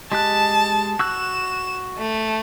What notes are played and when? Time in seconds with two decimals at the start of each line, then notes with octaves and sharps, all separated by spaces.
0.12 G#3 G4 A5 F#6
0.99 F#4 E6 F#6 E7
1.98 A3